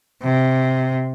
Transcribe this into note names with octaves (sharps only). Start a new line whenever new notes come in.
C3